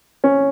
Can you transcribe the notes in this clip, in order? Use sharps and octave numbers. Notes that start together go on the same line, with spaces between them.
C#4